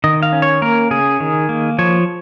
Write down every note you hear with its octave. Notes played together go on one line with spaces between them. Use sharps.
D#3 D#5
F5
C#4
C#5
A#3 A#4
C#3 G#4
D#3
A#3
F3 C#5